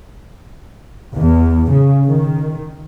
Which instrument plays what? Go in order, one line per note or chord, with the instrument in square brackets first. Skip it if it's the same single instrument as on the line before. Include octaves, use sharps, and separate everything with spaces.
[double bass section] E2
C#3
D#3